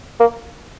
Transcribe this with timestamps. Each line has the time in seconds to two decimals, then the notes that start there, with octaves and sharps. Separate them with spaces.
0.20 A#3